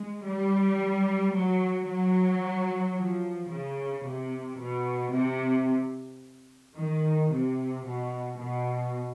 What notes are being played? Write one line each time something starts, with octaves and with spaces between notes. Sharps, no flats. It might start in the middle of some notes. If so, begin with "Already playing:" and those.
Already playing: G#3
G3
F#3
F#3
F3
C#3
C3
B2
C3
D#3
C3
B2
B2